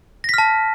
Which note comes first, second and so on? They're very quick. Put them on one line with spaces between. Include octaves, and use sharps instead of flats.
A#6 B6 F6 A5